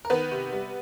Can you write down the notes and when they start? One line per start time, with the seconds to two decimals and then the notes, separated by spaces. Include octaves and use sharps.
0.05 A#4
0.10 D#3 B3 B4
0.31 C3
0.52 G3